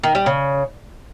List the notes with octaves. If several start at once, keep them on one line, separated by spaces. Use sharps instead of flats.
D#3
G3
C#3